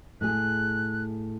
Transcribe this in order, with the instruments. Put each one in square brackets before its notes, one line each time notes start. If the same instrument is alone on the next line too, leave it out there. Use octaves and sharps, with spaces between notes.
[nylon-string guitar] A2 G#4 [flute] F#6